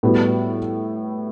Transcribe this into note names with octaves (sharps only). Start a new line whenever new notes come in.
A2 G3 B3 F#4 B4